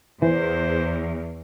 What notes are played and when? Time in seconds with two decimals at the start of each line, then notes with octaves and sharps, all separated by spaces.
0.22 E2 E3 C5